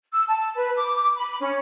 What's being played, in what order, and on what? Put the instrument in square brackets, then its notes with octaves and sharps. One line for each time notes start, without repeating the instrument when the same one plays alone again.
[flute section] E6
A5
B4
D6
B5
C#4